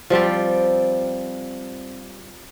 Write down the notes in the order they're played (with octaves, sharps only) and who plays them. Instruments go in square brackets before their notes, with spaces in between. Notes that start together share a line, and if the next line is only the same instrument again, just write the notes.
[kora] F3 G3 C4 G4